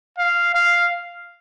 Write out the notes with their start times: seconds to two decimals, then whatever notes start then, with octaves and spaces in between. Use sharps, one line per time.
0.18 F5
0.55 F5